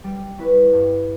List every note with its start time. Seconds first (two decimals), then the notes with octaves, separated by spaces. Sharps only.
0.04 G3
0.38 C#4 E4 B4
0.73 G2